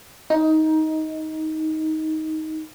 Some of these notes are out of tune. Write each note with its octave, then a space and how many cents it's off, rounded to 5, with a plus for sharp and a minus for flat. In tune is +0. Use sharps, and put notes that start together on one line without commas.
D#4 +15